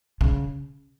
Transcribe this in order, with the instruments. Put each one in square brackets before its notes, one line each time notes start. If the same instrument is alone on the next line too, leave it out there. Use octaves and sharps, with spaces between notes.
[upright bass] C#3